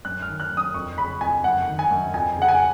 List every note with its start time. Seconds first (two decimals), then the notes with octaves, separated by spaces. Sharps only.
0.05 F#2 F#6
0.22 F6
0.28 D#3
0.40 F#6
0.51 F#2
0.57 D#6
0.74 F2 C#6
0.98 C#3 B5
1.21 F2 G#5
1.44 F#2 F#5
1.68 D#3
1.79 G#5
1.91 F#2
2.14 F2 G#5
2.37 C#3 F#5
2.48 G#5